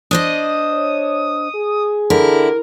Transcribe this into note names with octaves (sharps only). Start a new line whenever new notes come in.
D4 C5 D#5 D#6
C#5
G#4
D3 E4 A#4